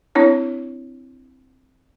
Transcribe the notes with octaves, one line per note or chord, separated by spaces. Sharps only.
C4 D4 E4 C#5